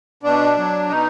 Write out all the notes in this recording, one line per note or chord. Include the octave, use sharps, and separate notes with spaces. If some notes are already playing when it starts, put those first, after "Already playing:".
B2 D4
F#3
B2 D#4